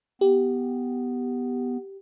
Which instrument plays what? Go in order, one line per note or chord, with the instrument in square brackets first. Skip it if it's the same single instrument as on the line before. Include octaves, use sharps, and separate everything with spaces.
[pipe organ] B3 [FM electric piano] G4